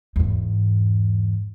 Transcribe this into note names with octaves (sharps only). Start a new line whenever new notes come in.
E2 G#2